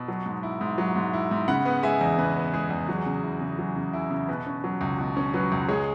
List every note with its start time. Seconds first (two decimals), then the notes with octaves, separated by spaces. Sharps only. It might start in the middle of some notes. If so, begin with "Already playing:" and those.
Already playing: B2 B5 E6
0.08 F#3
0.26 G#2
0.43 E4
0.61 G#2
0.78 F#3
0.96 G#2
1.13 E4
1.31 G#2
1.48 C#3 F#5 B5
1.65 B3
1.83 G#3 E5 G#5
2.01 E2
2.18 C#3 B4
2.36 B3
2.53 G#3 G#4
2.70 E2
2.89 F#3
3.06 C#3
3.23 E4
3.41 C#3
3.59 F#3
3.76 C#3
3.93 E4
4.10 C#3
4.28 B2 B4
4.46 C#4
4.64 F#3
4.81 C#2
4.98 B2
5.17 C#4
5.33 F#3 B4
5.52 C#2
5.68 G#3 G#4 C#5